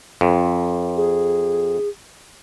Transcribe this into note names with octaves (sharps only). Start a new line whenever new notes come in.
F2
G#4